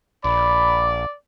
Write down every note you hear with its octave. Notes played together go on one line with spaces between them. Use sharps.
A#1 D5 B5